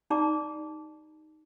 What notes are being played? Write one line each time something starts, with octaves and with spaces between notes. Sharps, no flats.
D#4 G4 D5 A5 A#5 D6